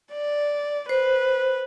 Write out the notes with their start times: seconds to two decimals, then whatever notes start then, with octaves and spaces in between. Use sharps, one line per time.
0.12 D5
0.89 B4 C5